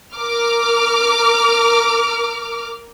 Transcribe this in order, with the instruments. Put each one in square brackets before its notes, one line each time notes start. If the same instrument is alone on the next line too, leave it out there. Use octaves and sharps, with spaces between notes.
[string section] A#4 D6 F6